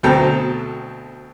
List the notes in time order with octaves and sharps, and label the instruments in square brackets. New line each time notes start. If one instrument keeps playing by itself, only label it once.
[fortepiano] D2 B2 C4 A4 G5 A#5